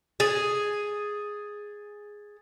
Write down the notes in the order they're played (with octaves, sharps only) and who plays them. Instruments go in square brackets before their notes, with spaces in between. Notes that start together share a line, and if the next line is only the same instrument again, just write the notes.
[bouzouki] G#4 [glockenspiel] A6